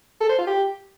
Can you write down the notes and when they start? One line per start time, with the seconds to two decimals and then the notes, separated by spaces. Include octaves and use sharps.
0.21 A4
0.30 C5
0.38 F4
0.47 G4